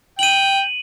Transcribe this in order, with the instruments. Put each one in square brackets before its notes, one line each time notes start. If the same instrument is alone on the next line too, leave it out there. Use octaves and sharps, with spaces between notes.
[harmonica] G5 [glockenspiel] D#7 F#7